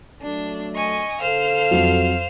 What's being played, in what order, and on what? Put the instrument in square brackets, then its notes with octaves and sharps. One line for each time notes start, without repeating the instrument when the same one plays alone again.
[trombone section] F#3 A3 [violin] D4
[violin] D#5 C#6 [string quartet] G#5
[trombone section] D3 A4 [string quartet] C5 [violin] F5 F6
[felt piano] F2 F#3